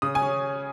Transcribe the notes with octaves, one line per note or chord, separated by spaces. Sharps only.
C#3 D#6
G#5
C#4